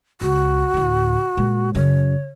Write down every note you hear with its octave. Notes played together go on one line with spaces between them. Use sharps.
C#2 F#4
D2 A2
A#2 G#3
F#2 C#3 C#5